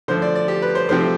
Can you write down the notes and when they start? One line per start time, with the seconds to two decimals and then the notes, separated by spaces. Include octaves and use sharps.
0.08 D3 F3 A3 C5
0.22 D5
0.35 D5
0.48 G4
0.62 B4
0.75 C5
0.89 C3 F3 A3 C5